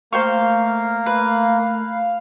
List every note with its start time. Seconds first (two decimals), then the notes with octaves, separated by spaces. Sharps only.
0.12 A3 A#3 C5 F5 G5 C#6
1.06 B4